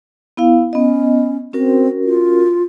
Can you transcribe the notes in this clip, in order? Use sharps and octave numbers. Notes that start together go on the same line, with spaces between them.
B3 E4 F5
B3 C#4 D#5
C4 C#4 F#4 A#4
F4